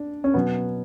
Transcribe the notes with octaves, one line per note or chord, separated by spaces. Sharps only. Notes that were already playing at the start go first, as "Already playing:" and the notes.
Already playing: D4
C#4
B2 F#3 B3